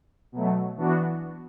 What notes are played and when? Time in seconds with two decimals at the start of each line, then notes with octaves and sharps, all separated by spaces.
0.32 B2 F#3 A3
0.77 E3 B3 D4 F#4